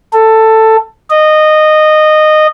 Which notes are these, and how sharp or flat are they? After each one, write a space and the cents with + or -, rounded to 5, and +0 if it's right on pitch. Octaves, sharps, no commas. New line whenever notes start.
A4 +10
D#5 -15